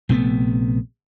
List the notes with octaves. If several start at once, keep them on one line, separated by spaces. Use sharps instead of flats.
A#1 C3 A3 B3